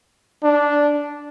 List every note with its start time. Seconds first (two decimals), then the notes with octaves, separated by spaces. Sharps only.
0.44 D4